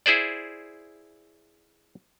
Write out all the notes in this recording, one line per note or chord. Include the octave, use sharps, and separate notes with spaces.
E4 G#4 C5 D5